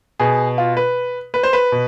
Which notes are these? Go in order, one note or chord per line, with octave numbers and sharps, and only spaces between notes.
B2 G#4
F4
B4
B4
C5
B4
B2